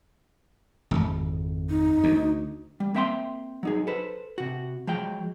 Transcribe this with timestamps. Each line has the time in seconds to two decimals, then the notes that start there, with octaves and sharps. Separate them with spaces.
0.91 D1 G#1 F2
1.70 D#4
2.04 D2
2.80 G3
2.94 A#3 C4 E5 G5 A#5 C6
3.63 F#3 D#4 G#4
3.87 A4 B4 C5
4.38 C3 F#4
4.87 F3 F#3 G#3 G5